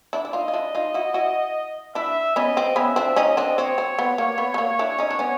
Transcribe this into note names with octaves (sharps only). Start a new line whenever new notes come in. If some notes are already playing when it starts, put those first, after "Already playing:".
D4 E4
E4
D#4 F4 D#5
F4
D4 E4
D#4 F4
E4 F#4
E4 F#4
D4 E4 E5
B3 C#4 D#5
C4
B3 C#4 E5
C4 D4
C#4 D#4 D#5
C4 D4
C4 C#5
C4
B3
A#3
B3
B3
A#3
D4 E4
C#4 D#4
D4
B3 C#4